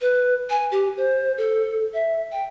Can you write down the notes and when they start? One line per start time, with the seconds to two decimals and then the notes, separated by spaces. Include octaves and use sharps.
0.01 B4
0.50 G#5
0.72 G4
0.97 C5
1.38 A4
1.94 E5
2.32 G5